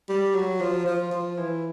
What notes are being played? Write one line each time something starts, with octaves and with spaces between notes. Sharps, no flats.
G3
F#3
F3
F3
F3
E3